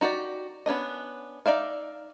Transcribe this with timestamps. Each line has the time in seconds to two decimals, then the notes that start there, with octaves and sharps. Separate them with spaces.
0.01 D#4 F#4 G4 D5
0.66 B3 C#4 D4 D#5
1.46 D#4 D5 E5 F5